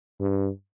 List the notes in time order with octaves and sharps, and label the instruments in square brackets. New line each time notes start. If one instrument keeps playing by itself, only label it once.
[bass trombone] G2